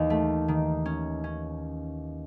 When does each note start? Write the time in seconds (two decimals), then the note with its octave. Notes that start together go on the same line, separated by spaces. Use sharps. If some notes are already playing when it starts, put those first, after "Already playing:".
Already playing: D#2 E3
0.10 A3
0.48 D#3
0.86 C#4
1.24 C#4